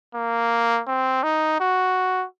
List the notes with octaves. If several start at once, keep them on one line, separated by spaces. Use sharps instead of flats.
A#3
C4
D#4
F#4